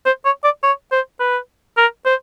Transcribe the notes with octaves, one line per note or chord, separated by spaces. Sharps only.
C5
C#5
D5
C#5
C5
B4
A#4
C5